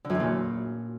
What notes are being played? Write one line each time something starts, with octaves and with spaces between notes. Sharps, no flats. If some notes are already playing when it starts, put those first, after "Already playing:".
D3
F#2
E2
A#2